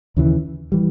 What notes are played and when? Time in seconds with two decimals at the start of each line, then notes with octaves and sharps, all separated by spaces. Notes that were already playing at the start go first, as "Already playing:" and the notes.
0.17 D#2 C#3 E3
0.72 E3 G3